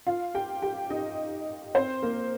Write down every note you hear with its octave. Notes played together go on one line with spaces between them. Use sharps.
F4 F5
G4 G5
G4 G5
D#4 D#5
C4 C5
A#3 A#4